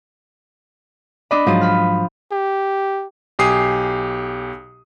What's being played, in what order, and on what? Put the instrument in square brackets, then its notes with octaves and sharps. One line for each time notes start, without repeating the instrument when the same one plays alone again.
[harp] D4 D#5 B5 [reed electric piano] D5 D6
[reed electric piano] G#2 F#3 [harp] F3 D4 D#6
[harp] B5 F6
[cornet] G4
[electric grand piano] B1 G4 G#5 D#6 C7